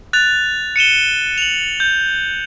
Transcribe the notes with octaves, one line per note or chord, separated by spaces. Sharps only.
F#6 A6 F7
C#7 D#7 E7 G7
F7 F#7
G6